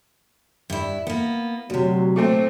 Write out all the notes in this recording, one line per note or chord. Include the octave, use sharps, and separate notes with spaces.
G2 E4
A#3 B3
D2 C3 F#3
A#2 A3 C4